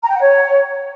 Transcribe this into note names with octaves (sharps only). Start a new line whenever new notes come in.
A#5
G5
F#5
C#5